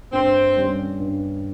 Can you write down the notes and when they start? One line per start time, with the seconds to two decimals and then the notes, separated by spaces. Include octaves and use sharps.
0.12 G2 C4
0.56 G3 C#4
1.00 G2